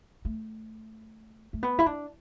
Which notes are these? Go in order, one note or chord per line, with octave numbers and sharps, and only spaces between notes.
A3
A3
B3
E4
D4